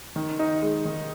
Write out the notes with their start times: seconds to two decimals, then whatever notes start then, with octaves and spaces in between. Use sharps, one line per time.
0.16 D#3
0.39 D#4
0.62 G#3
0.85 D#3